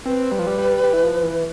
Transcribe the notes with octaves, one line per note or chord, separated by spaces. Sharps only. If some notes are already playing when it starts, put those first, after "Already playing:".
C4 B4
G3
F3
G3
G3
G3
E3
F3
E3